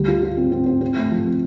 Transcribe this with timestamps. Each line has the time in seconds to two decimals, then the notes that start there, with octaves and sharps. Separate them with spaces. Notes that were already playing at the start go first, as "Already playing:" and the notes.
Already playing: D2 G3
0.08 F4
0.23 F4
0.37 C4
0.52 C4
0.66 C4
0.81 C4
0.96 A3
1.11 F3
1.27 C4